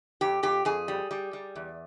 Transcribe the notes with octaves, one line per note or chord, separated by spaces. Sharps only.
F2 G4
F2 G4
F2 G#4
G3
G3
G3
E2